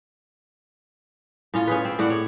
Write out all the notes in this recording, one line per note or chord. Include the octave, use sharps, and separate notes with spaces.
A2 C#4 F4
C#4 G#4 B4
C4
A2 D5 F#5
C#5